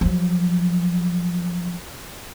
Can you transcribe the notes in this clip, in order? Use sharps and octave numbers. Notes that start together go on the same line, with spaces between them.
F3 F#3